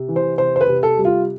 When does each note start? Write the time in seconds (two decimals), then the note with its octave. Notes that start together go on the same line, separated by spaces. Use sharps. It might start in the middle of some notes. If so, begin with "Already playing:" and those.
Already playing: C3
0.08 E3
0.16 C5
0.38 C3 C5
0.56 C5
0.61 B4
0.68 C3
0.83 A4
0.98 G3
1.05 F4